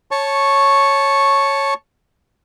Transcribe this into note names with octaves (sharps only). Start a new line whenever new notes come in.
C#5 A5 C#6